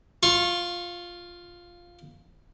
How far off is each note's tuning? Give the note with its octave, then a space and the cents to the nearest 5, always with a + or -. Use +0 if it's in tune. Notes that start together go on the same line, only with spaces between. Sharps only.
F4 +0 C#6 -35